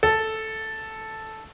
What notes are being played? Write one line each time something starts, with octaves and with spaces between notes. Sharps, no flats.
A4